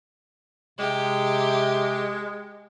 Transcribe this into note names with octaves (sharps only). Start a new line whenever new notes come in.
C3 G#3 G4